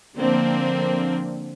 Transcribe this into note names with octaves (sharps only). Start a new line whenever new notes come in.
D3 F3 A#3 C4 D4